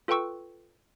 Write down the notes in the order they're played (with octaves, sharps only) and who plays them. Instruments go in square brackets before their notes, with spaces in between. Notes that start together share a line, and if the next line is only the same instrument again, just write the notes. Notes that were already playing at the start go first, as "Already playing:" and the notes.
[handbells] F4 A4 B4 G5 C#6 E6